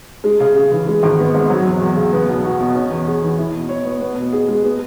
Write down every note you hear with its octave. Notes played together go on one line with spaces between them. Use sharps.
G#3
C#3
C#3
E3
G#3
G#1
B3
G#2
F#3
E2
E2
C#3
B3
B1
F#4
B2
C#4
E2
G#4
E3
E4
B2
C#5
B3
B3
B2
G#4
G#3
B3